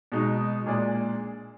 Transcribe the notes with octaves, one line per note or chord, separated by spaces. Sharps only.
B2 G#3 D#4
A#2 G#3 D4 G#4 D5